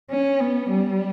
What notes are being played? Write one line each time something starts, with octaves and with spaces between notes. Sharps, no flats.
C#4
B3
G3